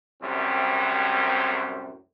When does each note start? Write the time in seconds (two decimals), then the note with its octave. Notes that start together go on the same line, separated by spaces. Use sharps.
0.22 C2 F#2 A2 G3 C4